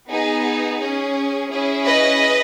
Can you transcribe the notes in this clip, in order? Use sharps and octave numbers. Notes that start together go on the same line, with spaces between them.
B3 D#4 G#4
C#4 G#4
C#4 E4 G#4
B4 D#5